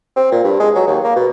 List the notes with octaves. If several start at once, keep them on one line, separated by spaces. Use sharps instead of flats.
C4
A#2
G2
G#3
F#3
D#2
A#3
B2